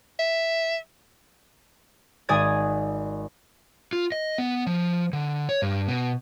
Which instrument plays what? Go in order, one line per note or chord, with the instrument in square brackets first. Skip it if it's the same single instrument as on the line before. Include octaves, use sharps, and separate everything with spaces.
[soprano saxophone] E5
[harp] G#1 G#4 D5 G#5 D#6 G#6
[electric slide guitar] F4
D#5
B3
F3
D3
C#5
G2
B2